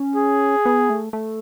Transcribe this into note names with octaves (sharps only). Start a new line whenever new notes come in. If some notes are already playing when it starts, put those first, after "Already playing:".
Already playing: C#4
G#4
B3
A3
A3